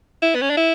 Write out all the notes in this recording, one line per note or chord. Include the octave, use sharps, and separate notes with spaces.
E4
B3
C#4
D4
E4